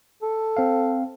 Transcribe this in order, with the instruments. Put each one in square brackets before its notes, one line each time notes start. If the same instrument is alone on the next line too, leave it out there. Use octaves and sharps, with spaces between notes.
[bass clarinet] A4
[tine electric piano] C4 F5